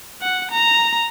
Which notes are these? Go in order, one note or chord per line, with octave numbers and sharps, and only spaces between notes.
F#5
A#5